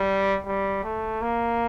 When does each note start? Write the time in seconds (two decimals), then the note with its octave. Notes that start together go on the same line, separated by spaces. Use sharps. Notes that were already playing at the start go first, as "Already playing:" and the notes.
Already playing: G3
0.46 G3
0.84 A3
1.22 A#3